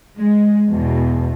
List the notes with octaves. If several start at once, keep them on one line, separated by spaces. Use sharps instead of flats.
G#3
E2 B2